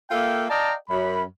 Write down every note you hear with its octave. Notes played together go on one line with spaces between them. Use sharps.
A#3 F4 A4 E5 G5
D5 D#5 F5 G5 A5 A#5
F#2 B5